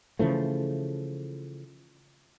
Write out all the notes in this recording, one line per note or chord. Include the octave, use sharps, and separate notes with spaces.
C#3 E3 F3 A3